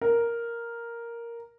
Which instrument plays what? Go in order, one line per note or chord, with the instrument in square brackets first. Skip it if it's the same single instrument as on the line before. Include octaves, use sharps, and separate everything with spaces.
[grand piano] A#4